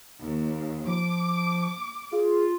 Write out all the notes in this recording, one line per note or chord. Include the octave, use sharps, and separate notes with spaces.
D#2
F3 D6
F4 G#4